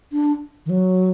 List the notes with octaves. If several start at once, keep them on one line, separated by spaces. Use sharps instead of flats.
D4
D#3
F#3